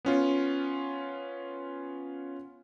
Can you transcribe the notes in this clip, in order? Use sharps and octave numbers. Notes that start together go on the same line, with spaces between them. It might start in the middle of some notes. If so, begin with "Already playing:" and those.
B3 C#4 F4